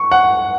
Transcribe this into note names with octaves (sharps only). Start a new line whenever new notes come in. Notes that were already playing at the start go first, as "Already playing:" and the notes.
Already playing: C#6
F#5